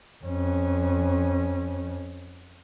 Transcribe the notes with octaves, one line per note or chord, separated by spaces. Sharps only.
F2 C#4